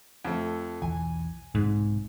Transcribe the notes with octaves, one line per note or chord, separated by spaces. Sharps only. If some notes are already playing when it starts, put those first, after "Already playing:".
F2 A3
B1 E2 E3 G#5
B1 G#2 C3